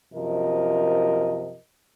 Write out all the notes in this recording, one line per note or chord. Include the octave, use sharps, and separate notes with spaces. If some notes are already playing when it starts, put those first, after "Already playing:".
F#2 C3 F3 A#4 D#5